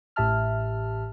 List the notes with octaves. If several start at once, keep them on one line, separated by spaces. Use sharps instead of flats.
A1 A2 G4 E5 A5 F6